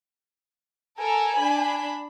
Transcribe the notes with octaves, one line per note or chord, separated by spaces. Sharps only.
A4 A#4 G#5
D4 B5